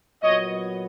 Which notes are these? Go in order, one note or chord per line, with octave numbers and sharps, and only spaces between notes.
A#2 F#3 B3 C#5 D#5